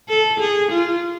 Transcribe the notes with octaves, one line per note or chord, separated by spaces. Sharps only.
A4
G#4
F4